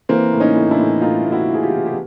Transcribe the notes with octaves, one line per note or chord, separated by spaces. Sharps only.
E3 A#3 C4
A2
C#4 D#4
A2
D4 E4
A2
A2 D#4 F4
A2
E4 F#4
E3
G#4
F4 G4
E3
G4